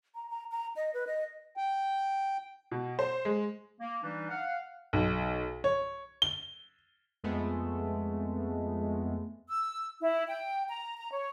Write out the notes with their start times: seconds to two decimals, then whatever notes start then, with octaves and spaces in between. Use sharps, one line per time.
0.15 A#5
0.30 A#5
0.51 A#5
0.76 D#5
0.94 B4
1.07 D#5
1.57 G5
2.72 B2
2.99 C5
3.25 G#3
3.80 A#3
4.03 E3 G3 D4 D#4
4.29 F5 F#5
4.93 B1
5.64 C#5
6.22 G7
7.23 F2 G#3 A3 B3
9.48 E6
10.02 E4
10.27 G5
10.67 A#5
10.96 A#5
11.11 C#5